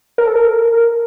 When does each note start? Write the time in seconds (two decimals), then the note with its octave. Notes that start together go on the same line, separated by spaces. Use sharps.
0.18 A#4
0.27 A4
0.36 A#4